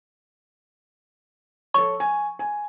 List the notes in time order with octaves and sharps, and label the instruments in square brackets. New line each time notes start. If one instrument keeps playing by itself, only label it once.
[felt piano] A4 C#5 [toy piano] C#6
[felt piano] G#5
G#5